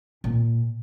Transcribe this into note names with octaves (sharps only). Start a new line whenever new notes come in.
A#2